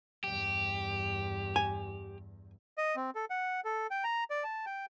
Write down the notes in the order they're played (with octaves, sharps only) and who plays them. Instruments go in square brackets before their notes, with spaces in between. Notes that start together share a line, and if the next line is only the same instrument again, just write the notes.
[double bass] E2 G2 [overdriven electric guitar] G4
[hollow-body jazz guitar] G#5
[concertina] D#5
C4
A4
F#5
A4
G5
A#5
D5
A5
G5